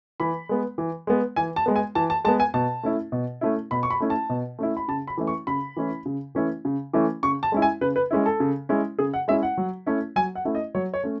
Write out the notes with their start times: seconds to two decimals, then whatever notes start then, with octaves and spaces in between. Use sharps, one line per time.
0.20 E3 B5
0.49 G#3 B3
0.78 E3
1.07 G#3 B3
1.36 E3 G#5
1.56 A5
1.66 G#3 B3
1.76 G#5
1.95 E3 A5
2.10 A5
2.24 G#3 A5
2.28 B3
2.40 G#5
2.54 B2 A5
2.83 A3 C#4 E4
3.12 B2
3.41 A3 C#4 E4
3.71 B2 B5
3.83 C#6
3.90 B5
4.00 A3 C#4 E4
4.10 A5
4.30 B2
4.59 A3 C#4 E4
4.77 B5
4.88 C#3 A5
5.07 B5
5.17 E3 A3 C#4 E4
5.27 C#6
5.47 C#3 B5
5.76 E3 A3 C#4 E4
6.06 C#3
6.35 E3 A3 C#4 E4
6.65 C#3
6.93 E3 A3 C#4 E4
7.23 C#3 C#6
7.43 A5
7.52 G#3 C#4 E4
7.62 G#5
7.81 C#3 B4
7.96 B4
8.11 G#3 C#4 E4
8.26 A4
8.40 C#3
8.69 G#3 C#4 E4
8.99 C#3 G#4
9.14 F#5
9.28 G#3 C#4 E4 E5
9.43 F#5
9.57 F#3
9.86 A3 C#4 E4
10.16 F#3 G#5
10.35 F#5
10.45 A3 C#4 E4
10.55 D#5
10.75 F#3 C#5
10.94 C#5
11.03 A3 C#4